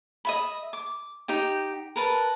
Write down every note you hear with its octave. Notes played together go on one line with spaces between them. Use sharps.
D#5 E5 B5
D6
D#4 G4 G5
A#4 B4 A5